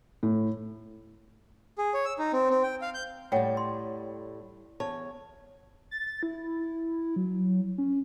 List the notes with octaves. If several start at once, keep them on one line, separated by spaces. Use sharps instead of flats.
A2
G#4
C#5
E6
D#4
C4
C4
G5
F5
G6
A2 G3 C#5 F#5 G5
C6
E2 C#5 A5
A6
E4
F#3
C#4